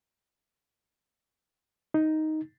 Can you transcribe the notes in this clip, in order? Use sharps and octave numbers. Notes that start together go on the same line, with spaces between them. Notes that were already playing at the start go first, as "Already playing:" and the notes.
D#4